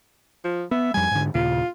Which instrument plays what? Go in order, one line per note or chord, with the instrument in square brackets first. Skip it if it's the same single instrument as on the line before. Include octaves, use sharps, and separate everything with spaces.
[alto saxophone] F3
[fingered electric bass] B3 [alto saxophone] E5
[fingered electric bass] F2 G3 [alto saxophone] G#5
[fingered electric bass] G#2 D3
[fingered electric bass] D#2 A#2 C#3 [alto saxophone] F4